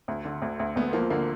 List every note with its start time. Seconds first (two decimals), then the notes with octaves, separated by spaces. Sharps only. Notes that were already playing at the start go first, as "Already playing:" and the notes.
0.08 D2
0.25 D3
0.42 D2
0.60 D2
0.76 D2 B3
0.93 F3 A#3
1.10 D3 A#3